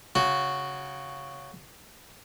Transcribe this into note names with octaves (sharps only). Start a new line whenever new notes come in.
C#3 F#4